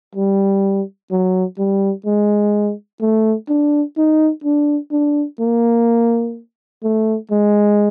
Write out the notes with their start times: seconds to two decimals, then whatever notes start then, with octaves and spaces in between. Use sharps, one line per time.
0.15 G3
1.11 F#3
1.58 G3
2.06 G#3
3.01 A3
3.49 D4
3.97 D#4
4.44 D4
4.92 D4
5.40 A#3
6.83 A3
7.31 G#3